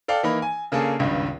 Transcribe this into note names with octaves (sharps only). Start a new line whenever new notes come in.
A4 D5 F5 G5
E3 A#3 D#4 B5
G#5
C#3 A#3 D4 G#4 A4
G#1 C#2 G2